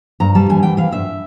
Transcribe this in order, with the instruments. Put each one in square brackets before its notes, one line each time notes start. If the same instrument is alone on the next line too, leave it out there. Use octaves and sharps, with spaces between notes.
[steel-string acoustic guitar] G2 A#5
G3 A5
E3 G#5
E3 G5
E3 F5
G2 E5